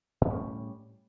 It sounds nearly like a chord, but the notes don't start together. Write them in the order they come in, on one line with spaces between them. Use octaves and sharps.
A2 A#3 C#4 G3